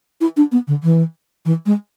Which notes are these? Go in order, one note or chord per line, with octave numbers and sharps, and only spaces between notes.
E4
D4
B3
D3
E3
E3
G#3